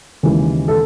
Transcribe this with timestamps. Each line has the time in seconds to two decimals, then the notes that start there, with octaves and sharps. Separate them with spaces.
0.23 D#2 C#3 E3 G#3
0.68 A4